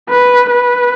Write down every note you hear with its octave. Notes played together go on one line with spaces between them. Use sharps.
B4
B4